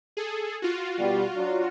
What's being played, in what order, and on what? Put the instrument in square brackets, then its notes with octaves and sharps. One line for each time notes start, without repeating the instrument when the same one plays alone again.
[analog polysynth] G#4 A4
F4 F#4
[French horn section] B2 G3
F#3 D4